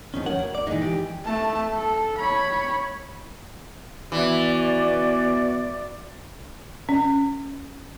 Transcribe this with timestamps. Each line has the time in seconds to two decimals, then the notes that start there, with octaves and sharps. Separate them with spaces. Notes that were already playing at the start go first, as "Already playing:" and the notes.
0.14 E2 D#3 F3 C#4
0.26 A#4 C#5 F#5
0.39 D2
0.55 D5
0.67 A#2 D#3 E3 G#3 D#4
0.82 G4
1.25 A3 A5
1.74 A4
2.18 C#5 B5
4.12 E3 B3 F#4 D5
6.89 C#4